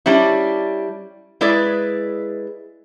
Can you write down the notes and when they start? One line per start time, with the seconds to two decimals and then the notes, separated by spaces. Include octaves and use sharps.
0.06 G3 C#4 D4 E4
1.41 G#3 E4 G#4 B4 D5